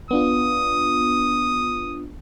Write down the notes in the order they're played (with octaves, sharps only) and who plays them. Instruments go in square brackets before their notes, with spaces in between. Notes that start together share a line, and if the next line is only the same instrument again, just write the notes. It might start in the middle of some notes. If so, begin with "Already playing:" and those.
[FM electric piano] B3 D4 F4 [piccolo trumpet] D#6